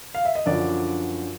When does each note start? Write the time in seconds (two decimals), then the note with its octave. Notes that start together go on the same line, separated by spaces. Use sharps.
0.15 F5
0.25 E5
0.35 D#5
0.46 F#2 D3 F3 D4 D5